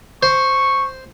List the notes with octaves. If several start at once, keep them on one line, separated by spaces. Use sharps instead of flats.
C5 C#6